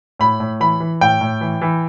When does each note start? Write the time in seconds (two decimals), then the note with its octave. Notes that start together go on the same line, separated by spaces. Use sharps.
0.20 A2 B5
0.40 A2
0.60 E3 B5
0.80 E3
1.01 A2 G5
1.21 A2
1.41 E3
1.61 E3